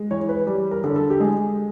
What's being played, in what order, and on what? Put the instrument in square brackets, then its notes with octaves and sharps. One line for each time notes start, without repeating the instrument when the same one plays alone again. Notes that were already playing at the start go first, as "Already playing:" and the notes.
Already playing: [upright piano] G#3
E3 C#5
B4
G3
A#4
D3
A4
G4
G#3 G#4